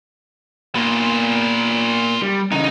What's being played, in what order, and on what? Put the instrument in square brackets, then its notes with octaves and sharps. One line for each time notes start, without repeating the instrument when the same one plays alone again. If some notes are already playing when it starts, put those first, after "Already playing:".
[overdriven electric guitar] A#2 [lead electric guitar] B3 F4
[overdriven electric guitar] G3
[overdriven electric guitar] C#3 E3 [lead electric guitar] D#4 D#5